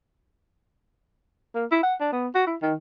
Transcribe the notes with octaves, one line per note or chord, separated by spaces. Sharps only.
A#3
E4
F#5
D4
B3
F#4
E4
D#3